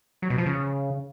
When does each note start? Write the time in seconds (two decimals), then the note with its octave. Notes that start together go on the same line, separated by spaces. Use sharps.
0.22 F#3
0.30 B2
0.38 F3
0.46 C#3